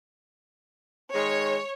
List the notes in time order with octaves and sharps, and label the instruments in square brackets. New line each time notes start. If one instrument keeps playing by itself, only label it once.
[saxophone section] D#3 G#3 [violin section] C#5